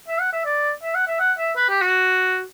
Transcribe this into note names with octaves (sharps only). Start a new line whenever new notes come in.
E5
F#5
E5
D5
E5
F#5
E5
F#5
E5
B4
G4
F#4